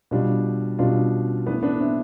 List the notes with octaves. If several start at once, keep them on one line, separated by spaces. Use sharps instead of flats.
B2 G3 D4 F4
B2 G3 D4 F4
A2 E3 A3 B3 D4
B3 D4
C4 E4